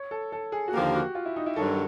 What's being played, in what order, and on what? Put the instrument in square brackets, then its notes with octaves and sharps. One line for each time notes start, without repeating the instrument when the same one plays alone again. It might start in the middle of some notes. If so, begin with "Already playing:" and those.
Already playing: [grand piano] C#5
A4
A4
G#4
F#4
[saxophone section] D#2 D3 F3 A#3 [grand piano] G4
[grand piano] F#4
F4
E4
D#4
E4
[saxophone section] G2 D#3 F#3 [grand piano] A4